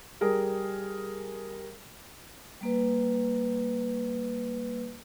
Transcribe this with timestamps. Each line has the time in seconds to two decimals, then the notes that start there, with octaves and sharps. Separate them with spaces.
0.21 G3 G#4 A#4
2.61 G3 A#3 B4